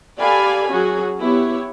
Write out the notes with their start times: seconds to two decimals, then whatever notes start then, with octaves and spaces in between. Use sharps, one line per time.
0.18 G4 A4 D5 F5 G#5 B5
0.70 F#3 C#4 F#4 G#4
1.19 B3 E4 G4 C#5